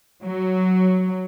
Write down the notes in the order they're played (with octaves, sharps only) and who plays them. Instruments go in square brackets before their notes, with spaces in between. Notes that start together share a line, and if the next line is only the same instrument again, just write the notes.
[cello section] F#3